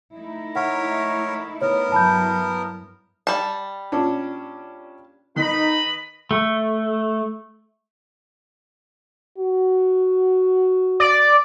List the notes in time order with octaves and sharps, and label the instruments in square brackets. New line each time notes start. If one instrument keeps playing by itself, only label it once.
[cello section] A3 D#4 E4
[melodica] A#4 C#5 E5 [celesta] F#5
[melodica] B3 A#4 [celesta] C#5
[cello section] G2 F#3 E4 [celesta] A5 B5 G6
[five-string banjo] G3 A5
[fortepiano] A#2 C#4 D4
[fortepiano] D#3 [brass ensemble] D#4 [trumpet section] B4 D#5 B5
[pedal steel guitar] A3
[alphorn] F#4
[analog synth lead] D5